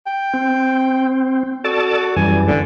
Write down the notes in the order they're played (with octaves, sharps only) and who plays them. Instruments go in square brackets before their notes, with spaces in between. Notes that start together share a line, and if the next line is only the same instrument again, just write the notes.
[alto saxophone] G5
[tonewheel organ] C4
[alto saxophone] F#4 [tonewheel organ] A4 D5 A5
[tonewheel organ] F#2 E3 G3 [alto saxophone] G#5
[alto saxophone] D3